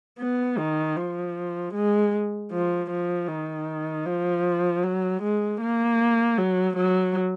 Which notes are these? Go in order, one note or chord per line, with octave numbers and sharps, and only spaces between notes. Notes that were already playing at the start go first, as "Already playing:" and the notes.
B3
D#3
F3
G#3
F3
F3
D#3
F3
F#3
G#3
A#3
F#3
F#3